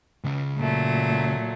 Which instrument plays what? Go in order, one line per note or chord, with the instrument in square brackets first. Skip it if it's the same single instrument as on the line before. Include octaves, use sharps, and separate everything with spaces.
[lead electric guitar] C#2 C#3
[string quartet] A#2 F#3 A3